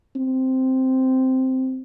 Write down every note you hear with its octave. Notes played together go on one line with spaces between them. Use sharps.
C4